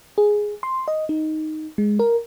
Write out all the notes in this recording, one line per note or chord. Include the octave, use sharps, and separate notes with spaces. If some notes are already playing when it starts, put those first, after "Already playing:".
G#4
C6
D#5
D#4
G#3
A#4